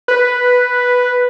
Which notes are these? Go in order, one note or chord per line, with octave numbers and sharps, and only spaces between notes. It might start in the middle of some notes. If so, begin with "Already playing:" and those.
B4
B4